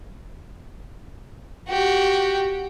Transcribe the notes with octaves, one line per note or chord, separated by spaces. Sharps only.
F#4 G4